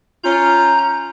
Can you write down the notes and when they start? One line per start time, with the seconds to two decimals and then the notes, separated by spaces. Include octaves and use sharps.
0.24 C#4 F4 A#5 G6